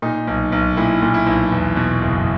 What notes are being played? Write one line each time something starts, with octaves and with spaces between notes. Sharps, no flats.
A#2 D#4
B1
B1
A#2 E4
A#2
E4
B1
E2
B2
F#1